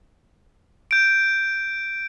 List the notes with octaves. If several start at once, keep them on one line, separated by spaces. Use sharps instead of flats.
G6 D7